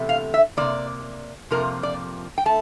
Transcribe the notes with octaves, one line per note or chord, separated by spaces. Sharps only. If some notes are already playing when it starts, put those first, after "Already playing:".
Already playing: E2 C3 A3
F5
E5
C3 F3 A#3 D5
F2 C3 F3 A#3 A#4
D5
G5
A3 A5